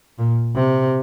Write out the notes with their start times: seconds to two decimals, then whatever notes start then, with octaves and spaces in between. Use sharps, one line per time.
0.18 A#2
0.55 C3